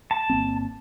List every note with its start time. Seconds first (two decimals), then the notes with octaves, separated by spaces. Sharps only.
0.11 A5
0.30 G1 A#3 C4